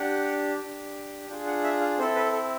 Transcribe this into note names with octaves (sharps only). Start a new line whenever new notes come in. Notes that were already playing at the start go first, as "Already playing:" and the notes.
Already playing: D4 G4 F#5
D4 G4
D4 F4 G#4 G5
F#5
E5
F5
C4 E4 A4 C5
B4
A4